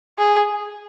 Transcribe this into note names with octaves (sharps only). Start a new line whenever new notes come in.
G#4